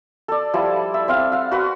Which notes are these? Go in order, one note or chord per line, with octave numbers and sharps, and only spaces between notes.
A4 D5
F3 G3 E4 A5
E5
C4 E5 F5
F5 F#5
F#4 B4 F#5